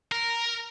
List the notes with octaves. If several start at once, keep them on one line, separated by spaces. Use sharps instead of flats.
A#4